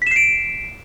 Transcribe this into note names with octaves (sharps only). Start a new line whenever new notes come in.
B6 C7 D7 E7